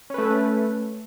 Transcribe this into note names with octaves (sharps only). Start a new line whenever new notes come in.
A3 C#4 B4